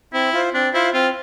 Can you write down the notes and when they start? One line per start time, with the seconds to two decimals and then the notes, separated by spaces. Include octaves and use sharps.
0.13 C4 E4
0.33 F4 C5
0.53 C4 D4
0.74 E4 F4 C5
0.93 C4 F4